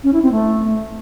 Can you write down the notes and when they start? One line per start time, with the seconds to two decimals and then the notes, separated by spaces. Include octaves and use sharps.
0.04 C#4
0.13 E4
0.22 C4
0.32 A3